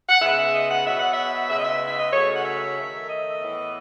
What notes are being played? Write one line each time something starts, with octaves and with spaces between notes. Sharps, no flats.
F#5
C#3 G#3 B3 E5
D#5
F#5
B2 F#3 B3 E5
F#5
E5
C#3 G#3 B3 E5
D#5
E5
E5
D#5
C#3 F#3 A3 C#5
F#5
E5
D#3 A3
D#5
A2 E3 B3